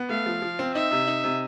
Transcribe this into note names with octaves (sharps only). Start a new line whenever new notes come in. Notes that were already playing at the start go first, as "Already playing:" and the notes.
Already playing: B3
A3 F5
F3
F3
C4
D#4 E5
C3
D#4
C3